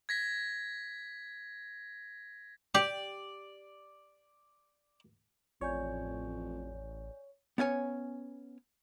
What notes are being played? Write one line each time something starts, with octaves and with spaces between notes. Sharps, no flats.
G#6 A#6 B6
G4 D5
A1 F2 C#5 D5 G#5 G6
B3 C#4 C#5 G#5